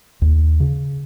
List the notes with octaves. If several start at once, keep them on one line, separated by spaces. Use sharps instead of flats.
D#2
C#3